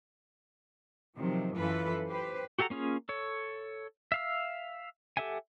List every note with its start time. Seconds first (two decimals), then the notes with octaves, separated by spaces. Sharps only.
1.17 C3 D#3 F3 F#3
1.56 F#2 E3 F4 A4 B4
2.09 G4 B4 C5
2.59 F#4 G4 A4 F#5 A#5
2.70 A#3 C#4 F4 G#4
3.09 A4 C#5
4.12 E5 F5 E6
5.17 G4 A4 E5 F#5 G#5